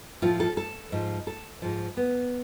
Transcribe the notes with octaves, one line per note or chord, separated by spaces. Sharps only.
A2 F3 F4
A4
A4
G#2 F3
A4
G#2 F3
B3